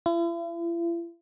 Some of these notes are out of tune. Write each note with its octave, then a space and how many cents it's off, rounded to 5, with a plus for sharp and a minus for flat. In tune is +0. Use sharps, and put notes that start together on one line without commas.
E4 +45